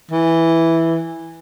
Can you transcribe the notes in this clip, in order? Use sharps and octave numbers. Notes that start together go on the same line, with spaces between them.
E3